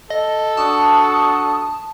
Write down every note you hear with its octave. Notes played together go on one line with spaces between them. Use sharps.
A4 D#5
D4 F#4 A5 D#6